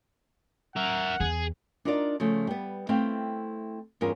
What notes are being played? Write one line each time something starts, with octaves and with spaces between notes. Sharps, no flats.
A#4 E5 F#5
E2 G#4
D4 D#4 F4 A#4 C5 D5
C#3 F3 A3
G3 B3
A3 C4 E4 F5 G5
E2 G2 C#4 F4 G#4 A#4